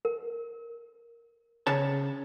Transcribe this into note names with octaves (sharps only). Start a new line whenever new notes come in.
A#4
C#3 C#5 A5